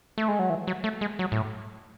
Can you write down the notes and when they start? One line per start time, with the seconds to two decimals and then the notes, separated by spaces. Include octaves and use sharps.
0.18 A3
0.28 G#3
0.39 F#3
0.50 E3
0.67 F#3
0.84 A3
1.01 G#3
1.19 F#3
1.32 A2